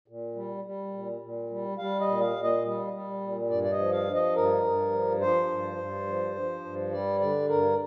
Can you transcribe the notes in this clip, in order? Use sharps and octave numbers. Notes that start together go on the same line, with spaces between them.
A#2
G3
G3
A#2
A#2
G3
G3 F5
D#5
A#2
F5
A#2
D#5
G3
G3
A#2
G2 D5
D5
D#5
F3
F5
F3
D#5
G2 A#4
G2
F3
F3 C5
G2
G2
F3
F3
G2
G3 D5
D3 D5
G2 A#4